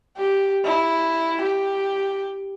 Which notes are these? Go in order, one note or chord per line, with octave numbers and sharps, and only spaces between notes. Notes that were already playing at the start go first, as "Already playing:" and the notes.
G4
E4
G4